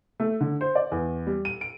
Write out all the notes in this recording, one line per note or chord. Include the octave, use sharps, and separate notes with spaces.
A3
D3
C5
D5
E2
G3
D#7
D7